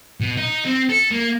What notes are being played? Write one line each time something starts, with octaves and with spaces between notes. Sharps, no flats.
B2
D#4
C4
A4
A#3